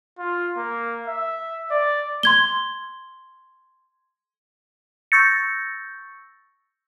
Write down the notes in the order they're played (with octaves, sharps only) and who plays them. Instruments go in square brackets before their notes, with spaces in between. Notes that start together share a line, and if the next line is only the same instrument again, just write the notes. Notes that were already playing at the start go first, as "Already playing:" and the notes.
[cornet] F4
A#3
E5
D5
[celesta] C6 G#6 G7
[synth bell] C#6 E6 G6 A6 A#6 C#7